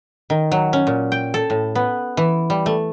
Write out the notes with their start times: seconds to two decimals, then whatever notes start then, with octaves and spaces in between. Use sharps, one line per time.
0.30 D#3
0.52 F#3
0.73 C#4
0.87 A#2
1.12 G5
1.34 A4
1.50 A2
1.75 B3
2.17 E3
2.50 G3
2.66 A3